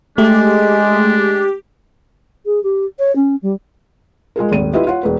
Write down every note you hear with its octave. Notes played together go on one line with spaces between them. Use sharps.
G#3 A3 D4 G4
G#4
G4
C#5
C#4
G3
G#3 F4 G#4 A#4
D#1 G#1 D#7
E4 F4 G4 B4 D#5 E5
F4 C#5 F#5
E1 B4